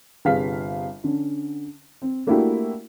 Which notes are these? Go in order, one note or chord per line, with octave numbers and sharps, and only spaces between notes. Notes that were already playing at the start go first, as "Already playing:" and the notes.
G1 C3 G#4 F5 F6 B6
D3 C#4
C4
A3 A#3 D4 E4 F#4 G4